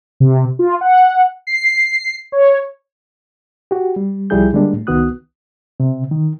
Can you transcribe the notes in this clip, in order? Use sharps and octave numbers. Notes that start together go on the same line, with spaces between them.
C3
F4
F#5
C7
C#5
F#4 G4
G3
C2 F3 G3 E4 G#4 G6
D3 G3 G#3 A#3 D4
A2
C2 D#3 B3 F#4 D#6 F#6
C3
D#3